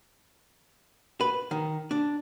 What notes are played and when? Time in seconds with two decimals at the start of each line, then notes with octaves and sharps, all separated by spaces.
1.21 B4
1.51 D#3
1.91 D4